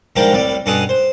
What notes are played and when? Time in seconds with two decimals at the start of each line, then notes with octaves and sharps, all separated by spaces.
0.16 G#2 F3 G3 D4 A#4 G5
0.32 C2 A2 G3 D5
0.66 G2 B2 C#4 A4 F#5 D#6
0.89 C5